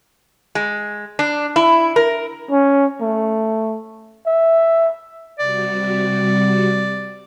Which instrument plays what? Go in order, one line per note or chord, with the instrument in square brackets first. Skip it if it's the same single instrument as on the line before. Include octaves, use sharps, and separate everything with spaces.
[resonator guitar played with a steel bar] G#3
D4
E4
A#4
[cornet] C#4
A3
E5
[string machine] C3 G3 F#4 [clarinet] D5